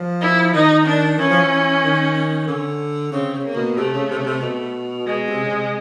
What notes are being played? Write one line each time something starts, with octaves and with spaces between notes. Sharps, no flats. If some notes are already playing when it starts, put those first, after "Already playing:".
Already playing: F3
E4
D#3 D#4
D4
E3 C#4
F3
E3
D#3
D3
C#3 C4
C#3
A#3
B2
C3 A3
C#3
C3
C#3
C3
B2
B2 G#3
C3
C#3
C3